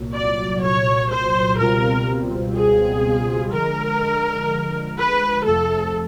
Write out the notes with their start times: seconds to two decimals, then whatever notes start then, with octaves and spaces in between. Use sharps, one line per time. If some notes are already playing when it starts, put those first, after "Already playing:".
Already playing: C2 A#2 F#3
0.14 D5
0.62 C#5
1.11 C5
1.59 C#2 B2 G3 C4 F4 A#4
2.56 G#4
3.52 D3 F3 G#3 A#4
4.98 B4
5.45 F2 C3 F3 A3 A4